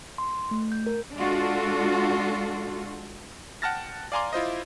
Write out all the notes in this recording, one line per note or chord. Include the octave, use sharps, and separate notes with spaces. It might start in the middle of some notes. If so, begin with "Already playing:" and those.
C6
A3
G6
A#4
G#3 D4 F4 F#4 A4
F#5 G5 A5 F6 A6 A#6
D5 F5 G#5 A#5 C6 D6
E4 F4 C5 D#5